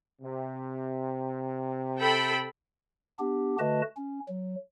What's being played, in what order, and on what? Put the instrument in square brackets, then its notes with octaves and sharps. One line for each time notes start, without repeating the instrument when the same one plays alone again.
[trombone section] C3
[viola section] A4 G5 B5
[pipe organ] B3 D4 G4
D3 A3 F#4 B4 D#5 A5
C#4
F#3